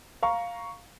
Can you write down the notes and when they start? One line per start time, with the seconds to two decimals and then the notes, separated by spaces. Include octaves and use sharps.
0.23 F5 A#5 C#6